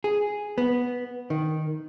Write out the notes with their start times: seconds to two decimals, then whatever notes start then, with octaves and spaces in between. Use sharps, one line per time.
0.04 G#4
0.58 B3
1.30 D#3